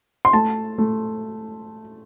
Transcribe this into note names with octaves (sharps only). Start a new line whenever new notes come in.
C6
A3 A5
A3